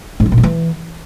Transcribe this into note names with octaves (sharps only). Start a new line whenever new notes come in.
G#2
F#3
A#2
B3
E3